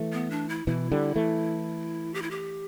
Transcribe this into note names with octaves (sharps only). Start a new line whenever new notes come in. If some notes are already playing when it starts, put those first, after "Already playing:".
Already playing: E3 A3
B3
D4
E4
B2 E3 E4
D3 G3
E3 A3
G4
E4
G4